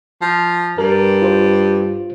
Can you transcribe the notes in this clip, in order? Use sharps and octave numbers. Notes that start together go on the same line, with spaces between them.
F3
G2 A#4
F4 C5